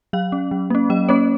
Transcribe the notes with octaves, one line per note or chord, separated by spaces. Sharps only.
F#3 F5
C#4
F#3
A#3 C#4
F#3 D#5
A#3 C#4 C#5